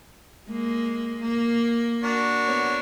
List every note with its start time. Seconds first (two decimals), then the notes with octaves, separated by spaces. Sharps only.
0.48 G#3 A#3
1.20 A#3
2.04 D4 F#4 A#4
2.46 B3 C#5